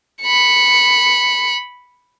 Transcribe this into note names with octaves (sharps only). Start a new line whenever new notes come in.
B5 C#7